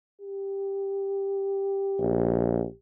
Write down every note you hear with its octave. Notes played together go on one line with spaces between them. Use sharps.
G4
A#1